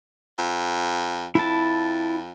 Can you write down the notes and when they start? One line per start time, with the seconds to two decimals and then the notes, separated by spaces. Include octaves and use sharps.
0.38 F2
1.35 F2 E4 A5